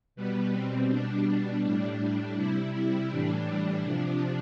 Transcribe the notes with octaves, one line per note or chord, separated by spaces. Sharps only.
B2 G3 B3
C4
B2 G3 D4
D4
A2 G3 D4
D4
C3 G3 E4
E4
A2 E3 G3 D4
C3 F3